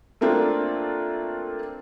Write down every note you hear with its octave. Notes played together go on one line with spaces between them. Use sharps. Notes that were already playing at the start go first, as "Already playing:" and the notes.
A3 A#3 C4 D4 F4